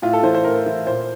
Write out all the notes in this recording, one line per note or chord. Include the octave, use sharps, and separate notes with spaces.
A2 F4
A4
E3 C5
C5
A2 A#4
E3
A#2 C5